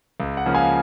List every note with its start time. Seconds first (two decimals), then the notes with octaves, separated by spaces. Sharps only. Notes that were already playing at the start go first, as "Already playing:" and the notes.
0.20 C#2
0.37 F#5
0.46 C#3 F3 A#3 C#4
0.54 F5 G#5